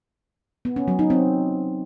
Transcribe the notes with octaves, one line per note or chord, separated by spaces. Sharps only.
B3
C#4
F#3
D#4
C4